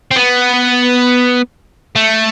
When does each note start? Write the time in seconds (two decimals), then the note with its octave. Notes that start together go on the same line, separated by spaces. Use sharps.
0.11 C4
0.16 B3
1.96 A3